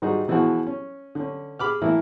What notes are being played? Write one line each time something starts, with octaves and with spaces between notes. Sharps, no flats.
G#2 D#3 G3 D#4 F#4 G#4
B2 E3 F3 E4 F#4 G#4
C#4
D3 C#4
G#4 B5 D6 F6
A2 E3 A#3 E4